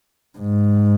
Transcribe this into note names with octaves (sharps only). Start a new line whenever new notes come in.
G#2